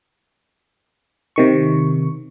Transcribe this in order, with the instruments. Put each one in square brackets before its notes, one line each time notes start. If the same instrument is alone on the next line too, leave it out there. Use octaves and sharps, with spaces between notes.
[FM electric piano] C3 D#3 C#6